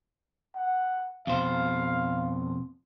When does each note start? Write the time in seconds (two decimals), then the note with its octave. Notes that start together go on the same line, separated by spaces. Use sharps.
0.55 F#5
1.27 F2 B2 C5 F5